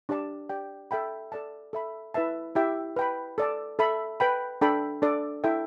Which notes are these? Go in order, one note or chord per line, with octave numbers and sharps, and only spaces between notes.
D4 G4 D5 A5
G4 D5 G5
A4 E5 G5 B5
A4 D5 A5
A4 E5 B5
E4 B4 E5 A5
E4 G4 E5 G5
B4 G5 B5
A4 D5 A5
A4 E5 B5
B4 G5 B5
D4 A4 G5 B5
D4 A4 D5
E4 A4 E5 G5